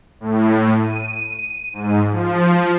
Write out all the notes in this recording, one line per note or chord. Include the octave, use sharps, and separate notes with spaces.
A2
D#7
G#2
F3